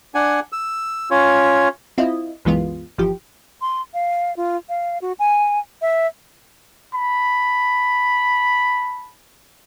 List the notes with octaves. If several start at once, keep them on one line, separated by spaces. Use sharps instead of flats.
D4 F#5 G#5
E6
C#4 F4 C#5
C4 E4 F4 D#5
C2 F#2 E3 G#3 B3 F4
G1 E3 F3 G4
C6
F5
F4
F5
F#4
G#5
E5
A5 B5